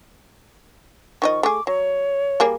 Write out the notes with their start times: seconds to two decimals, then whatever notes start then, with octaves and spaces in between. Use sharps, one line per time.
1.22 D#3 F3 D#5 C#6
1.43 A3 G#4 D6
1.67 F#3 C#5
2.40 G3 A#3 G#4